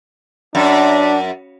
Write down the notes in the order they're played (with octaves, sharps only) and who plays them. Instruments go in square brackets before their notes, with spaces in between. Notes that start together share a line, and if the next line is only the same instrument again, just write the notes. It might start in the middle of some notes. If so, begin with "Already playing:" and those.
[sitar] F#2 [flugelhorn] D4